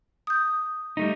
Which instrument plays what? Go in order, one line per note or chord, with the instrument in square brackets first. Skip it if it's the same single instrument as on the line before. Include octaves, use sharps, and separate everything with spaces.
[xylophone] D#6 G6
[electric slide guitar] G3 A3 D#4